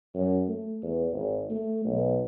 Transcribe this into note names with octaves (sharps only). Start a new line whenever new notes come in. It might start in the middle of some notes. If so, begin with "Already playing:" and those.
F#2
A3
E2
G#1
A3
B1